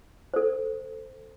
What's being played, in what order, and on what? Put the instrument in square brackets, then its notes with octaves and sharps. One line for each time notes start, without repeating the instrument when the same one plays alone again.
[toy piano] A4 C5